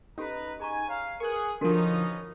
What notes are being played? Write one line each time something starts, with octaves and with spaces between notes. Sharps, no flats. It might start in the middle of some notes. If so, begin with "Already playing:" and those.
C#4 D#4 G4 A4 B4 A#5
G#4 G#5 A#5 C#6
C#5 F5 A#5
G#4 A#4 B4 C#6 F#6
D3 F3 B3 C#4 D#4 F#4 A4 A#4